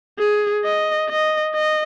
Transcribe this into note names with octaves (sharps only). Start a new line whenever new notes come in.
G#4
D#5
D#5
D#5